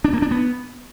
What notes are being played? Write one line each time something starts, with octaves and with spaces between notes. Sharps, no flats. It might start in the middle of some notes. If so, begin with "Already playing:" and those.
D4
A#3
D4
B3